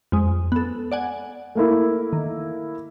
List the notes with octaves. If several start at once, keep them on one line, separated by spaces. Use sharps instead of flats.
F2 G#3
B3 A4
D5 F#5 G#5
A3 A#3 E4
D#3